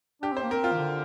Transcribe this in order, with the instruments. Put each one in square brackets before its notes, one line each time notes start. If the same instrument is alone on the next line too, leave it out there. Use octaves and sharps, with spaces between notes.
[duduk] D4 [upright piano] G4
[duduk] C4 [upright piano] C5
[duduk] A#3
[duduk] C4 [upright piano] A#4
[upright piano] F4
[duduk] D#3
D3